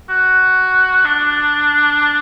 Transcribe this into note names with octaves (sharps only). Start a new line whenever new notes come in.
F#4
D4